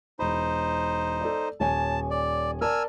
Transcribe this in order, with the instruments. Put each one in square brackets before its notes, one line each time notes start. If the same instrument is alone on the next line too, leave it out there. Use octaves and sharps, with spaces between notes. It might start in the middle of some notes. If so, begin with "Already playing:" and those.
[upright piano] E1 B5 [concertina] D#4 C5
[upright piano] A4 D5
[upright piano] D#1 C#5 G#5 [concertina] A5
[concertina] D5
[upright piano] A#4 D5 A5 [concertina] G#5 E6 F6